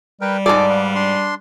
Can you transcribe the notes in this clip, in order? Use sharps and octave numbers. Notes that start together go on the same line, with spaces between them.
G3 A#4 B4 G5
G#2 G#4 A4 D5 A5 D6
B4 F5
D4 C6